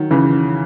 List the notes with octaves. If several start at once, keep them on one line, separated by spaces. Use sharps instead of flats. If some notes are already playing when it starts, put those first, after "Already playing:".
Already playing: D#3 F#3
C#3 E3